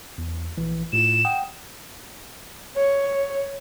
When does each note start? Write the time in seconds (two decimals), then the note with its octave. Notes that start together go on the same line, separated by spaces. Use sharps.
0.18 E2
0.57 A#1 E3
0.93 A2 F4 E7
1.25 F#5 G5 D#6
2.76 C#5